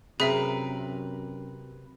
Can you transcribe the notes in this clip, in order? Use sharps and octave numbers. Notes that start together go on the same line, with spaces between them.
F#2 C3 G#4 A#4 B4 E5